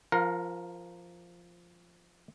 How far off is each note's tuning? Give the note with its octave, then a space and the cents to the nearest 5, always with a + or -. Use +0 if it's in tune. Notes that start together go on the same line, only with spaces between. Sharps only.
F3 -5 A#4 +0 F5 +35